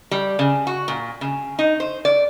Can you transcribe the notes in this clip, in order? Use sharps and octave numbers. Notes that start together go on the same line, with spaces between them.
G3
C#3
F#4
A#2
C#3
D#4
C5
D5